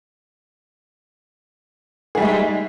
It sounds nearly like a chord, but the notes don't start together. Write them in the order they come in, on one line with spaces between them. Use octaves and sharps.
G#4 G3 E4 G#3 D#4